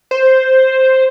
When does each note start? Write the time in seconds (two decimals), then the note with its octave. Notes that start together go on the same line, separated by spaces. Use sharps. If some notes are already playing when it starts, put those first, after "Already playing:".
0.11 C5